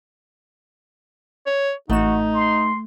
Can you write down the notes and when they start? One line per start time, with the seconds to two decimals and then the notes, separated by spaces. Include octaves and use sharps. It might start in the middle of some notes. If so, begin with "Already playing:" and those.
1.46 C#5
1.90 A1 A3 D#4 F#4 E7
2.34 C6